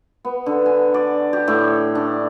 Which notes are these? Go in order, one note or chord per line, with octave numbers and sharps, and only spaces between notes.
B3
D3
G#5
D5
G4
A2
D4